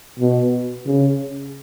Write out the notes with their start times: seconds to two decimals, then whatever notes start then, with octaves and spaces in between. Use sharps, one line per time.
0.19 B2
0.86 C#3